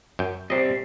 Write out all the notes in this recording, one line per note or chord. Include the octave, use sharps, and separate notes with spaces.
F#2 G5
C3 G3 C4 D#5